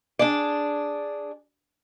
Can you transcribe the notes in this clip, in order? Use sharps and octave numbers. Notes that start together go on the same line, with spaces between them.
D4 G#4 D5